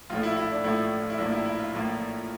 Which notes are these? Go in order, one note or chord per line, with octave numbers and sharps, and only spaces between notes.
A#1 A2 F3 A3 F4
E4
E4
D4
A#1 A2 F3 A3 E4
F4
E4
A#1 A2 F3 A#3 D4
E4
E4
F4
A#1 A2 F3 A#3